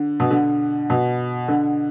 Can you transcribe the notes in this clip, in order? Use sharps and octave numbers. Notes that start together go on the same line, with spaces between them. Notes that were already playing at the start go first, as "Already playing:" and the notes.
Already playing: D3
B2
D3
B2
D3